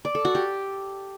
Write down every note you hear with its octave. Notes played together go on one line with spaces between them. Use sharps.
D5
A4
F#4
G4